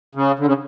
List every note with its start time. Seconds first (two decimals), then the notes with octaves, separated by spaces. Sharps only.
0.15 C#3
0.39 D3
0.46 C#3